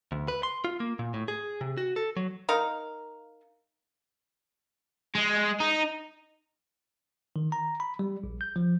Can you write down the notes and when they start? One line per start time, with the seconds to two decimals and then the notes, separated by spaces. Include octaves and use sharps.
0.12 D2
0.28 B4
0.43 C6
0.64 F4
0.80 A#3
0.99 A#2
1.14 A2
1.28 G#4
1.61 C3
1.78 F#4
1.96 A4
2.17 F#3
2.49 D#4 A#4 F5
5.15 G#3
5.60 D#4
7.36 D#3
7.52 A#5
7.80 B5
7.99 G3
8.24 A#1
8.41 G6
8.56 F3